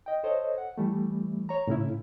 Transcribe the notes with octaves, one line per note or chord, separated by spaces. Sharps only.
D#5 G5
A4 C5 C#5 D#5
F#5
E3 G3 A3
C#5 A#5
A2 C#3 C#4 E4